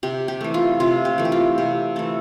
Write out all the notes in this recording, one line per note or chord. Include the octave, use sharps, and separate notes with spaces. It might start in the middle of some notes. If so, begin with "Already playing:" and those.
C3 G4
G4
E3 A3
F4
C3 F4
G4
E3 A3
G4
F4
C3 G4
E3 A3 A4